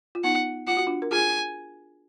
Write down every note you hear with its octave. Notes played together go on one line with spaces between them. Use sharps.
F4
B3 D#4 F#5
F4 F#5
F#4
D4 F4
A#4
F4 G#4 G#5